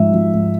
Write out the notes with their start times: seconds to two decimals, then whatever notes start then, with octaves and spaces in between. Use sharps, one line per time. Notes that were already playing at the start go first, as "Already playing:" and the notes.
Already playing: G#2 F3 E5
0.13 F3
0.34 G#2